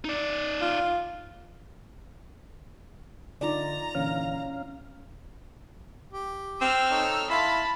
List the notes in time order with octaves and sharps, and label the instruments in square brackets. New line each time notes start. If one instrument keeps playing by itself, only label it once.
[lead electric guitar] D#4 D5
[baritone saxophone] F4
[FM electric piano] D3 [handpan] D#4 F4 D5 [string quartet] A#5
[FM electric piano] A#2 D3 E3 [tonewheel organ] C#4 F5
[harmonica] G4
[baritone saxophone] C4 [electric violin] E6 F6
[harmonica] D#4 A4 C#5
[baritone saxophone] E4 [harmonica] F5 C6 [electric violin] A5 B5